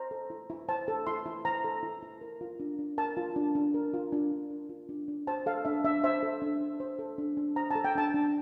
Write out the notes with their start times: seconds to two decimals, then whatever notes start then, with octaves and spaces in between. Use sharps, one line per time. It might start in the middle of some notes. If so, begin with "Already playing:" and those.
Already playing: C5 A#5
0.11 A4
0.30 E4
0.50 E4
0.69 C5 A5
0.88 A4
1.07 E4 C6
1.26 E4
1.45 C5 A#5
1.64 A4
1.83 E4
2.03 E4
2.21 A#4
2.41 F4
2.60 D4
2.79 D4
2.98 A#4 A5
3.17 F4
3.36 D4
3.55 D4
3.74 A#4
3.94 F4
4.12 D4
4.32 D4
4.50 A#4
4.69 F4
4.89 D4
5.08 D4
5.27 C5 A5
5.46 A4 F5
5.65 D4 E5
5.84 D4 E5
6.04 C5 E5
6.23 A4
6.42 D4
6.61 D4
6.80 C5
6.99 A4
7.18 D4
7.37 D4
7.56 C5 A#5
7.71 A4 A5
7.85 G5
7.95 D4 A5
8.14 D4